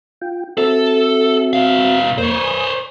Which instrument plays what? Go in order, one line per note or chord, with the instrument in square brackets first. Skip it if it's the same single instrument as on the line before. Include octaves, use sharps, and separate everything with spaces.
[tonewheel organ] F4 G5
[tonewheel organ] C4 F#4 E5 [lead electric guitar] A4
[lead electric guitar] B2 F5
[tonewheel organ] F2 A#3 C6 [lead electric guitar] C5 C#5
[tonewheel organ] G#5 D#6